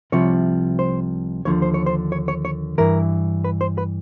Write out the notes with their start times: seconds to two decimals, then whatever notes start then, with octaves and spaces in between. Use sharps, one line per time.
0.12 C2 C3 F3 C#5
0.79 C5
1.45 D#2 D3 F3 C#5
1.62 C5
1.74 C#5
1.86 C5
2.12 C#5
2.28 C#5
2.45 C#5
2.78 G2 E3 A#4
3.44 B4
3.61 C5
3.78 B4